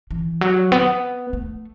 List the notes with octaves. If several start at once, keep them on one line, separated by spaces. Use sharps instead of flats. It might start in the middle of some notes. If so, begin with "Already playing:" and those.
E3
F#3
B3
A3